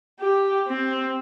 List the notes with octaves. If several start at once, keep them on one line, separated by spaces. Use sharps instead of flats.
G4
C4